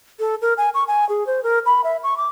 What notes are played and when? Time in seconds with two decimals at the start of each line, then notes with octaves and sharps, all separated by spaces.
0.19 A4
0.42 A#4
0.58 G#5
0.74 C#6
0.87 G#5
1.09 G#4
1.27 C5
1.43 A#4
1.66 B5
1.84 E5
2.03 C#6
2.17 D6